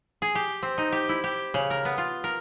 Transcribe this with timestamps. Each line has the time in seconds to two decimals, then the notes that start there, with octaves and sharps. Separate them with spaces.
0.22 G#4
0.35 G4
0.63 C4
0.78 D#4
0.92 G4
1.09 E4
1.24 G4
1.54 C#3
1.70 A#4
1.85 B3
1.98 F4
2.24 A#4